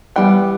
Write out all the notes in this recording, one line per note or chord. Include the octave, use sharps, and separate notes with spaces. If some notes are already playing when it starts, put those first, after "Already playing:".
E3 G3 B3 G5